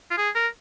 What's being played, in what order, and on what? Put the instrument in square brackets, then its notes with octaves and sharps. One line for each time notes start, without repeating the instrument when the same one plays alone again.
[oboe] F4
G#4
A#4